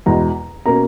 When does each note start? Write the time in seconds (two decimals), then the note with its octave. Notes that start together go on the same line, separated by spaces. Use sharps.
0.06 E2 B2 G#3 A#5
0.66 B2 A#3 C#4 A#5